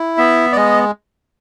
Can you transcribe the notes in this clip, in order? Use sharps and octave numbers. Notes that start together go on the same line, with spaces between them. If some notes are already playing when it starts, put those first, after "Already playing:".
Already playing: E4
B3 E5
D5
G#3 D#5